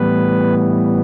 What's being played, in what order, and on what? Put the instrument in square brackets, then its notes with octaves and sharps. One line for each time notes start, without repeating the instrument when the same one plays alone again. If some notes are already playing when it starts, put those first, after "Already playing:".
Already playing: [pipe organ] A2 E3 G3 B3 B4